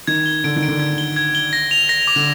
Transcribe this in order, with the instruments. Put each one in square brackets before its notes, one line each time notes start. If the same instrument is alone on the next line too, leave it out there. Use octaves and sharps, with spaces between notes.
[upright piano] D#3 [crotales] G#6
[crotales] G7
[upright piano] D3 [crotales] D7
[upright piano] D#3
[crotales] D7
[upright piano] D3
[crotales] G#6
G7
G#6
G7
A#6
F7
A#6
D6
[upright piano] D3